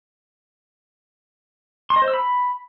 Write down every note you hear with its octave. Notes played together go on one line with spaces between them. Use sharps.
C6
D#5
C5
E6
B5